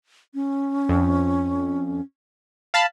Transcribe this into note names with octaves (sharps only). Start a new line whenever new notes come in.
C#4
F2
F5 A5 B5